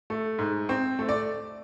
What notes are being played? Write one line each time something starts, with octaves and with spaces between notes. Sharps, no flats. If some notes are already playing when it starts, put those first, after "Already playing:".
A3
G#2
C4
A3
D5